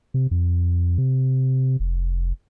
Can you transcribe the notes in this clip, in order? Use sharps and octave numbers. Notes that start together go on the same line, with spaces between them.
C3
F2
C3
F1